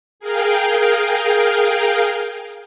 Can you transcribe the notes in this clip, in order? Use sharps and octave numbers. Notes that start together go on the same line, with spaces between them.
G#4 A#4 F5 G5